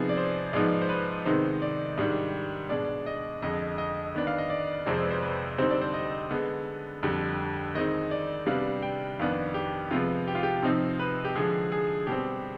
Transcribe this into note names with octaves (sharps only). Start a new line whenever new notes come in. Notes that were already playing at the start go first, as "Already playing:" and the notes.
Already playing: C3 F3 B3 D#4 G#4
D5
C5
G#2 F3 G#3 B3 D#4 D5
C5
B4
C3 D#3 G#3 B3 D#4 C5
D5
G#2 D#3 G3 D4
B2 G#3 D4 D5
D#5
F2 D3 G#3 D#5
D#5
D#3 B3 D4
F5
D#5
D5
F2 C3 F3 G#3 C4 D5
C5
B4
C5
B4
D3 G3 C4 D#4 C5
D5
C5
D#5
D3 G#3 B3
F2 D3 G3
D#3 G#3 C4 D#4 D#5
D5
C3 G3 B3 D4 F5
G5
F2 D#3 B3 D4 F5
G4
C3 F3 G#3 B3 F4
G4
F4
G4
C3 F3 C4 D#4
B4
G4
D3 F3 G#3 G#4
G#4
B2 G3 C4 G4